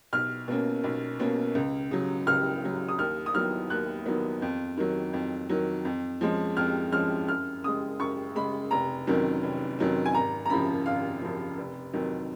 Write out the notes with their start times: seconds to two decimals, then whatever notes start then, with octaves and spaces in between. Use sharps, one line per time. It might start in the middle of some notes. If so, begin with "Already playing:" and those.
0.13 B1 F6
0.48 B2 A#3 C#4
0.84 B1
1.20 B2 A#3 C#4
1.55 C#2
1.91 C#3 F#3
2.27 C#2 F6
2.63 C#3 F#3
2.89 D#6
2.98 D#2 F6
3.26 D#6
3.35 D#3 F#3 B3 F6
3.70 D#2 F#6
4.06 D#3 F#3 B3
4.42 F2
4.77 D#3 F#3
5.13 F2
5.49 D#3 F#3
5.85 F2
6.21 F3 G#3 C#4
6.57 F2 F6
6.92 F3 G#3 C#4 F6
7.28 F#2 F6
7.64 C#3 G#3 D#6
8.00 F#2 C#6
8.35 C#3 G#3 B5
8.71 F1 A#5
9.07 F2 D#3 F#3 C#4
9.43 F1
9.79 F2 D#3 F#3 C#4
10.06 G#5
10.14 G#1 A#5
10.46 A#5
10.50 F#2 C#3 F3 B5
10.86 G#1 F5
11.22 F#2 C#3 F3
11.58 F1
11.93 F2 D#3 F#3